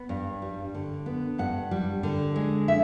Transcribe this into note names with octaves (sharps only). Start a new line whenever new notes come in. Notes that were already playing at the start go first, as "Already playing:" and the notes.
Already playing: B3
G2
G3
D3
B3
G2 F#5
G3
D3
G#3
E5